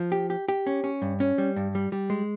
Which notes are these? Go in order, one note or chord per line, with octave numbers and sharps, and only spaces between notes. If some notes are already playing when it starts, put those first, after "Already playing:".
Already playing: F3
G4
G4
G4
C#4
C#4
G2
C#4
G3
G2
G3
G3
G#3